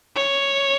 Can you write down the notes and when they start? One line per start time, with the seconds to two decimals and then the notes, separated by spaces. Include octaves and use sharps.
0.16 C#5